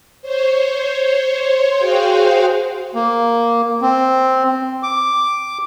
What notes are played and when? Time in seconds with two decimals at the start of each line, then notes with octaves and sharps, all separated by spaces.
0.22 C5 C#5
1.77 F#4 G#4 C5 F5 G5
2.95 A#3
3.82 C4
4.83 D6